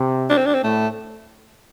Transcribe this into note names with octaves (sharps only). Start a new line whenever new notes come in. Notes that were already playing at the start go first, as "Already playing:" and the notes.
Already playing: C3
D4
C4
D4
C4
A2 A3